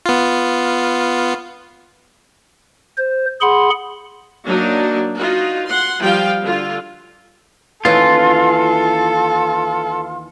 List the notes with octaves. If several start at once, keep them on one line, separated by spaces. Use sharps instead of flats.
B3 F4
C5
G#4 F#5 B5 C6
F#3 A#3 D4 D#4
D#4 F4 F#4
F#5 C6
F3 G3 F4 F5 G5
D3 F4
D#2 E3 C#4 F4 A4